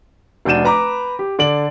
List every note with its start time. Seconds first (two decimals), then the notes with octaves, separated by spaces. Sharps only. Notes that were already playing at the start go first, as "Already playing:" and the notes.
0.45 F1 D4 F#4 G6 D#7 E7
0.65 B4 A#5 B5 D6
1.19 G4
1.39 D3 D5 D7 F#7